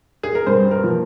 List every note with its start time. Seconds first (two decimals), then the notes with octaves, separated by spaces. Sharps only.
0.23 G#4
0.35 A#4
0.46 G2 C5
0.71 A#4
0.84 F3 A#3